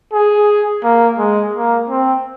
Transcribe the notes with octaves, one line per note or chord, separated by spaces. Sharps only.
G#4
A#3
G#3
A#3
C4